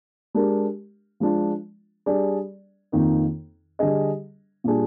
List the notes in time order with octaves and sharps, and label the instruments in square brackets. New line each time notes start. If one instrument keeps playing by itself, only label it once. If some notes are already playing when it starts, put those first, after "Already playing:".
[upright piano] G#3 D4 G4 A#4
F3 G#3 D4 F4
G3 D4 G#4 D5
F2 D#3 A#3 D#4
D3 G3 D4 G#4 D#5
A#2 G3 D4 G#4